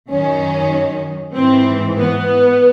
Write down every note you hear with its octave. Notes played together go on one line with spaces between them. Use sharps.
F#2 D#3 C#4
G#2 E3 C4
B3